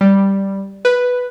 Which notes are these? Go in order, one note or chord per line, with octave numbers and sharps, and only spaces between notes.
G3
B4